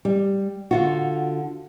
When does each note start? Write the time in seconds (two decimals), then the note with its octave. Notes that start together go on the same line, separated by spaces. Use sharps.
0.05 G3
0.71 D3 F4 F#4